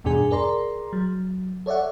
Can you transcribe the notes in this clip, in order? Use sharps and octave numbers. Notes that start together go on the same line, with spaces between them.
E2 G2 B2 D4 G#4 G#5
G#4 A#4 D5 A#5 C6
F#3
A4 C#5 D5 E5 F#5